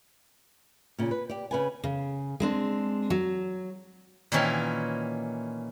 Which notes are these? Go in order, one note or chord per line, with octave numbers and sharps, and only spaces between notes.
A#2 C#3
B4
G4 D5
C#3 B4 G#5
C#3
G#3 C4 D4
F#3
A#2 D#3 E3 C#4 E4